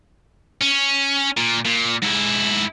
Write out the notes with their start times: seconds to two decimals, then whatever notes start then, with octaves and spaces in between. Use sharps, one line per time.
0.61 C#4
1.37 A#2
1.65 A#2
2.03 G#2 E4